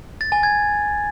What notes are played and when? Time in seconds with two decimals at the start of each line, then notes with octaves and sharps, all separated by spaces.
0.21 A6
0.32 G#5
0.43 G#6